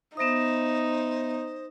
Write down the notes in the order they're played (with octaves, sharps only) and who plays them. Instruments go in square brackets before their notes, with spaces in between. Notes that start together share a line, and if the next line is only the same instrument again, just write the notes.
[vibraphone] B3 E5 [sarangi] D#4 [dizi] C5 [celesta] D#6 A#6 E7